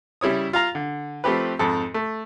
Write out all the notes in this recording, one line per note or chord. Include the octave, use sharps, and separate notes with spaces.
C#3 G3 E4 C#5 D#6
F4 F5 A#5
D3
F3 A3 C4 G4 B4
F2 G#2 A4
A3